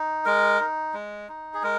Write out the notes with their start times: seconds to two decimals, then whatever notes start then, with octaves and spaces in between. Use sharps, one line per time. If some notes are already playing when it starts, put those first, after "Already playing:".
Already playing: D#4
0.25 G#3 A#4
0.60 D#4
0.94 G#3
1.29 D#4
1.54 G#4
1.63 G#3 A#4